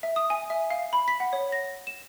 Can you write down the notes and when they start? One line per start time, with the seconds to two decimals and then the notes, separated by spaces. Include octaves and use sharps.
0.03 E5
0.16 D#6
0.30 G#5
0.50 E5
0.70 F5
0.93 B5
1.08 B6
1.20 F#5
1.33 C#5
1.52 A#6
1.87 E7